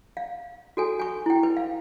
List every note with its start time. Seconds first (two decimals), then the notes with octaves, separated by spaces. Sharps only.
0.17 F5
0.77 F#4 A4 G#5
0.99 G#5 C#6
1.26 E4 G5
1.43 B4
1.57 F5